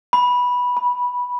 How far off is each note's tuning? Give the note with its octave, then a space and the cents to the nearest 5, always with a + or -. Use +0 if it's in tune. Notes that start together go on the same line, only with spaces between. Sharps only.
B5 -10
B5 -20